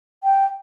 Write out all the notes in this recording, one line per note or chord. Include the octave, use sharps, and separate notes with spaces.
G5